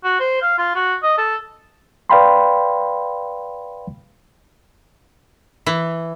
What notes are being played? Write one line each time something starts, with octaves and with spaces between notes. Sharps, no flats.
F#4
C5
F5
F4
F#4
D#5
A4
B4 D5 F5 G5 B5 C6
E3